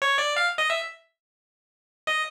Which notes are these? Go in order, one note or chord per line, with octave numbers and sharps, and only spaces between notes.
C#5
D5
F5
D#5
E5
D#5